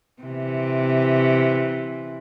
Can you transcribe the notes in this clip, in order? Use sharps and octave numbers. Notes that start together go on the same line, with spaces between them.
C3 E3